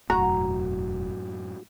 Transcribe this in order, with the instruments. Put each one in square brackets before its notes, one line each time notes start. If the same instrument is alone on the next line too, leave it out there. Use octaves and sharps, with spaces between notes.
[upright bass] E1 F#3 [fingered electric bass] F#2 A2 [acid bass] F#4 [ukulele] A#5